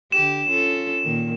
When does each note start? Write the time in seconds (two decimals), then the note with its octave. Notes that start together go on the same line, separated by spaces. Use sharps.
0.12 D3 G4 E7
0.48 C#4 F4 A4
1.03 A#2 D#3